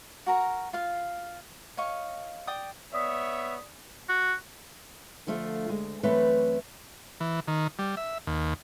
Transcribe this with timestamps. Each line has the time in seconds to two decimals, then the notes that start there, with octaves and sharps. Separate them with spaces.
0.26 F#4 A#4 A#5
0.73 F4 F5
1.77 C#5 D#5 F5 C#6
2.47 D5 G5 D#6
2.93 B3 C#5 D5 E5 D#6 B6
4.09 F#4
5.27 D3 F3 A3 F4
5.69 D2 G#3
6.03 F#2 E3 A3 C4 B4 C#5
7.20 E3
7.47 D#3
7.79 G3
7.97 E5
8.27 D#2